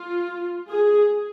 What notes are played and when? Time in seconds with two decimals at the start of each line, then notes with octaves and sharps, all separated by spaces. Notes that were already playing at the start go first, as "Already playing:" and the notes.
Already playing: F4
0.70 G#4